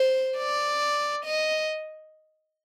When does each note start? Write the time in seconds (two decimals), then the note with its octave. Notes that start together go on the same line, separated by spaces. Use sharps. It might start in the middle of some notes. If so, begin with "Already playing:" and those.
Already playing: C5
0.38 D5
1.25 D#5